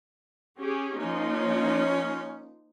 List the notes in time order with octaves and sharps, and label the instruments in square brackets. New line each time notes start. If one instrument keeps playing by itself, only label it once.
[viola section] C#4 G4 G#4
[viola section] F3 A#3 D#4 [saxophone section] C#4